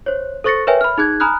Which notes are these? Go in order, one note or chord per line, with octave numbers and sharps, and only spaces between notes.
C5 C#5
A4 C5 C#6 A6 A#6 C#7
A#4 B4 C#5 E5 G5 G#5
B5 F6
D#4 G#4 F#6 G#6
G#5 A#5 B5 D#6 F6 F#6